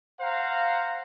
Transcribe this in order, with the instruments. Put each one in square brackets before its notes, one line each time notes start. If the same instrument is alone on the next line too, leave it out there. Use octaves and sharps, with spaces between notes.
[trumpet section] C5 F5 F#5 A#5